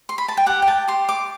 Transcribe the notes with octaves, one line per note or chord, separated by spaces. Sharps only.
C6
B5
A5
G5
G4 F#5
G5
A5
G4 C6
D6